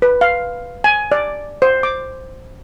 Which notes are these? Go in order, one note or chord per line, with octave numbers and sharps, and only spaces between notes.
B4
F5
G#5
D5
C5
D6